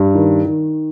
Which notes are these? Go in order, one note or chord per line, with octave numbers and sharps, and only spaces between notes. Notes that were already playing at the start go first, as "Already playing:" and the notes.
Already playing: G2
D#3
D#3